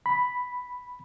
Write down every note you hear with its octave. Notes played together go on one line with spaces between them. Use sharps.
B5